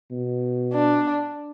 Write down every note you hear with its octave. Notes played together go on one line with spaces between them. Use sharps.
B2
D4